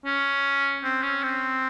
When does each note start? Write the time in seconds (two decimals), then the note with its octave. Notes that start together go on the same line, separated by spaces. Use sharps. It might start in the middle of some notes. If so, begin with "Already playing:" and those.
0.05 C#4
0.84 C4
1.03 C#4
1.23 C4